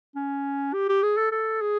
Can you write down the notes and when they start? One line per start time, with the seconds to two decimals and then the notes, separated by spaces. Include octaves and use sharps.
0.15 C#4
0.73 G4
0.89 G4
1.02 G#4
1.17 A4
1.32 A4
1.61 G#4